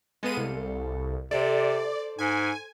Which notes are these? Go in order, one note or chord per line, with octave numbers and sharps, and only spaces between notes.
G#3 B3 A4 F5 D#7
C2
C3 A4 C5 D5
G#2 G#5